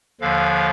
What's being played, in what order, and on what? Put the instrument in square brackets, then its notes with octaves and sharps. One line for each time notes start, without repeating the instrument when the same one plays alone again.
[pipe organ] D#2 D3 F3 F5